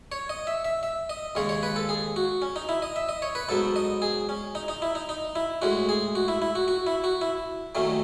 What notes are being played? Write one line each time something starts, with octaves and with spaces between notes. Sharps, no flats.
C#5
D#5
E5
E5
E5
D#5
D#2 C#3 G#3 C#5
C#5
B4
A4
G#4
F#4
C#4
D#4
E4
D#5
E5
D#5
C#5
B4
G#2 F#3 B3 A4
D#5
G#4
C#4
D#4
D#4
E4
D#4
D#4
E4
A2 G#3 C#4 F#4
G#4
F#4
E4
E4
F#4
F#4
E4
F#4
E4
D#2 D#3 F#3 A3 C#4